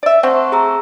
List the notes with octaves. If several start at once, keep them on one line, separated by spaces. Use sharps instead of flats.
D5 E5
A3 C4 F#5 C6 C#6
G#4 A#5 E6